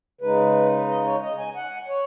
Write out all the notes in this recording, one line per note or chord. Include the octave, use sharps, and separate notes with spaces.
C#3 G#3 D#4 B4
D#5
C#5
D#5
G#5
F#5
C#5